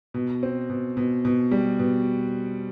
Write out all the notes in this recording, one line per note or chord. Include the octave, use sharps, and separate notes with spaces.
B2
C4
B2
B2
B2
G3
B2